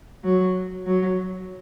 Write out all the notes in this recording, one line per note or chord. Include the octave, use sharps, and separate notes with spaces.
F#3
F#3